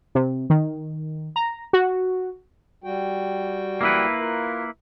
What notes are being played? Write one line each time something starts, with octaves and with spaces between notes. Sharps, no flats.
C3
D#3
A#5
F#4
G3 F#4 G5
A#3 E4 B4
F4 A#4